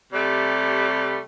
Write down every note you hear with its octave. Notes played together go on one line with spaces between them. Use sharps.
C3 G3 A3